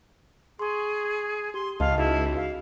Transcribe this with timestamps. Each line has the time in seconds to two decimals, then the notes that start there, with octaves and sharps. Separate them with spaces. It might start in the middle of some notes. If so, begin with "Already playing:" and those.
0.59 G#4 C6 C#6
1.54 G4 C6
1.80 C#2 D#5 F5 A5
1.98 D#4 E4 F#4 G#4
2.36 F5